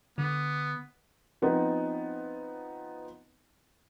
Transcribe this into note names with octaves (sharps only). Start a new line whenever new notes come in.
D3 B3
F3 B3 C4 D#4